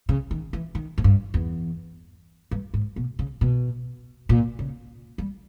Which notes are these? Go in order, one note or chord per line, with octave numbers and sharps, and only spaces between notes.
C#3
D#3
E3
D#3
G#2
G2
E2
G2
G#2
B2
C#3
B2
A#2
C#3
G3